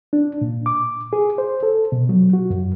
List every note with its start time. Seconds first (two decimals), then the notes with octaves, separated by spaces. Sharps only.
0.13 D4
0.41 A#2
0.66 D6
1.13 G#4
1.38 C5
1.63 A4
1.92 B2
2.09 F#3
2.33 F#4
2.50 F#2